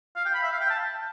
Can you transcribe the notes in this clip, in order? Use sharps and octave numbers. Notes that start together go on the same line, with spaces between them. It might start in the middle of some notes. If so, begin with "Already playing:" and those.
F5
G5
B5
E5
F5
G5
A5